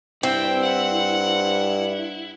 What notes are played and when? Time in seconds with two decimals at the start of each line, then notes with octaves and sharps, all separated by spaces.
0.23 G2 C4 E4 G5
0.62 F#5